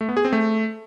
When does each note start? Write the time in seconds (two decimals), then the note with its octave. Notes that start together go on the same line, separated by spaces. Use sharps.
0.01 A3
0.09 B3
0.17 G#4
0.25 C4
0.33 A3